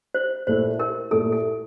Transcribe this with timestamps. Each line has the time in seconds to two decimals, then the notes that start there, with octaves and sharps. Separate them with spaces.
0.14 C5
0.47 A#2 A3 E4 C5
0.79 A#4
1.11 A#2 A3 E4 A4
1.32 A4